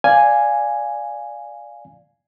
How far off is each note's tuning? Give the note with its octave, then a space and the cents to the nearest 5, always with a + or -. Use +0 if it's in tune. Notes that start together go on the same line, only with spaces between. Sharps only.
D5 +0 F5 +0 G#5 +0